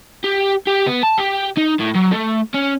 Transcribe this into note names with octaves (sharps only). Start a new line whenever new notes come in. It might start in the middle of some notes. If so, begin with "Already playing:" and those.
G4
G4
B3
A5
G4
D#4
A2
F#3
A3
C#4